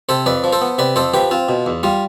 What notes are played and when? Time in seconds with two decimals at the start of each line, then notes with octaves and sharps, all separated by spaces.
0.09 C3 A4 C5
0.26 F2 B4 D5
0.44 F3
0.52 A4 C5
0.61 B3
0.78 C3 B4 D5
0.96 F2 A4 C5
1.14 F3 G4 B4
1.31 C4 F4
1.49 B2
1.66 E2
1.83 G3 F4